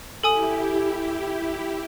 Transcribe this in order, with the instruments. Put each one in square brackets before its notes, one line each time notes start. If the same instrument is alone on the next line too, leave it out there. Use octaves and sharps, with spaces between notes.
[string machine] E4 G4 [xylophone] A4 G#5 D#6